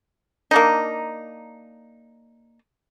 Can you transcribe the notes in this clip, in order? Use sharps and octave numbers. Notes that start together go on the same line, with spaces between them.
A#3 D4 D#4